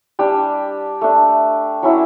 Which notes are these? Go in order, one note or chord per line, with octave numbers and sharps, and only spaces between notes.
G3 D4 G4
A3 D4
F#3 C#4 E4